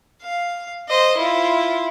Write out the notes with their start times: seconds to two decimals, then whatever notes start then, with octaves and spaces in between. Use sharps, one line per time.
0.22 F5
0.88 C5 D#5
1.17 E4 F4